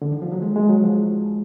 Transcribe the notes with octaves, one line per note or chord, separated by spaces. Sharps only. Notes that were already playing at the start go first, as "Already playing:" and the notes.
D3
D#3
F3
F#3
G#3
G#3
F#3
F3